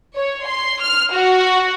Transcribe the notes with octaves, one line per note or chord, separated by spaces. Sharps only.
C#5
C6
F6
F#4